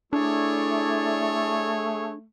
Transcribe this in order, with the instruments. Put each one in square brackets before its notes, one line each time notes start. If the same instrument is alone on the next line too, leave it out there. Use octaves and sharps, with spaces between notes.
[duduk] A3 [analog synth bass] D4 [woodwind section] E4 D5 [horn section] G#4 A4 C#5